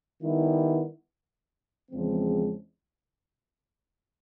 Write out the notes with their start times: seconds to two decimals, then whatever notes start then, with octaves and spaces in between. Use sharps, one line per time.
0.22 D#3 G3 B3 E4
1.91 E2 C#3 F3 G#3 C4